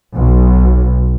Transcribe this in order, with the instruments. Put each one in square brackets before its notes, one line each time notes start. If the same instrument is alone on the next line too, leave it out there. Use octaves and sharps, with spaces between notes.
[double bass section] B1